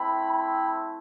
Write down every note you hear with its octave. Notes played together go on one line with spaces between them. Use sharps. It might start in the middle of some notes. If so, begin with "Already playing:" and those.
Already playing: A3 C4 E4 G5 B5
G5 B5